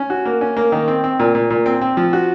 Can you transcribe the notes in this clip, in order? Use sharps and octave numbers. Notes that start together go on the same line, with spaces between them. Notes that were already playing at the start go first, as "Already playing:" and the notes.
Already playing: C#4
F#4
A#3
C#4
A#3
D#3
C4
C4
A#2
A#2
A#2
C4
C4
F3
F#4